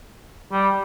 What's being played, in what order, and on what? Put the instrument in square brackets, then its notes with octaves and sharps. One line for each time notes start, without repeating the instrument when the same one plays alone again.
[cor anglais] G3